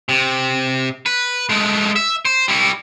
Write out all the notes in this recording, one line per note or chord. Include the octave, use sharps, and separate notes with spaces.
C3
B4
G#3 A3
E5
C5
G3 E4